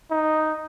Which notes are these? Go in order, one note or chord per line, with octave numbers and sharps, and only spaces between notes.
D#4